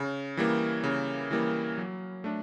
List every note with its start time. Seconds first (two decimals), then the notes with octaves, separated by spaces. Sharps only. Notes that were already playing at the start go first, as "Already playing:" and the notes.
Already playing: C#3
0.37 E3 G3 A#3
0.84 C#3
1.31 E3 G3 A#3
1.78 F#3
2.24 A3 D4